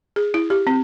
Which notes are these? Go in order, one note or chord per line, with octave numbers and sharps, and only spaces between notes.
G#4
E4
G4
C4